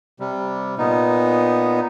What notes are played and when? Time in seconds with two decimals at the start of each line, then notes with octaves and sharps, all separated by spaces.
0.20 C3 G3
0.78 A#2 B3 D#4